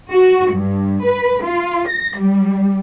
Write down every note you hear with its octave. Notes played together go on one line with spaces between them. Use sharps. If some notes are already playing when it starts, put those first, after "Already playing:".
F#4
G2
B4
F4
A#6
G3